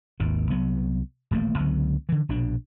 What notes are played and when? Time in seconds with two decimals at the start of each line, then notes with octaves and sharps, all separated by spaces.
0.20 G#1 D#2 D#3
0.50 C2 F#3 B3
1.31 D#1 A1 A3 A#3
1.59 C#2 D3 F#3 B3
2.09 D3 E3
2.29 A#1 B2 D4